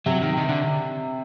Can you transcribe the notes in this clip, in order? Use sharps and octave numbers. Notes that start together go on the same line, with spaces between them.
C3 F#3
D#3
D#3
D3